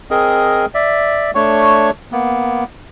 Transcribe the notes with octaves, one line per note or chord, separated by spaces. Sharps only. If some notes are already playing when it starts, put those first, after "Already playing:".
C4 G#4 A#4 D#5
D5 E5
A3 D4 C#5 C#6
A#3 B3